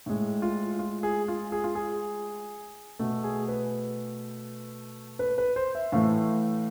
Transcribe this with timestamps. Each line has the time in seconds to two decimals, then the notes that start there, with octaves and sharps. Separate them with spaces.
0.06 A2 G#3
0.42 F4
0.79 F4
1.03 G#4
1.28 F4
1.52 G#4
1.64 F4
1.75 G#4
2.99 B2 A3
3.24 G#4
3.48 B4
5.19 B4
5.38 B4
5.56 C5
5.75 E5
5.92 A2 E3 A3 F5